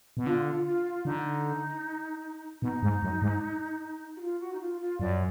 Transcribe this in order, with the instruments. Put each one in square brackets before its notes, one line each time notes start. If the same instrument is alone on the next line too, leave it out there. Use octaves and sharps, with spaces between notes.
[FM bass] B2
[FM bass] D3 [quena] F4
[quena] F4
[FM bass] D3 [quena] D#4
[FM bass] B2 [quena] D#4
[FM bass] G#2
F#2
G#2
[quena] F#4
F4
F#4
D#4
F4
F4
[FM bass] F#2 [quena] D5